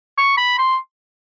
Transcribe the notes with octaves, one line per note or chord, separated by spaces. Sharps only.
C#6
B5
C6